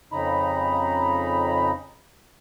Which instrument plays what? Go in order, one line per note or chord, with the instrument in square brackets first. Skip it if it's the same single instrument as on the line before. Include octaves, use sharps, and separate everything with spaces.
[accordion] F2 C#3 D#4 A#5 B5